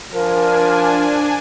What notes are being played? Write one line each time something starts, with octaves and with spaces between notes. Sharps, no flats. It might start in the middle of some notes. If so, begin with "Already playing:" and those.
F3 D4 A#4 G#5